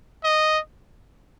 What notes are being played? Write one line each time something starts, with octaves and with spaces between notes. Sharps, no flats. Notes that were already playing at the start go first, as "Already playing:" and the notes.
D#5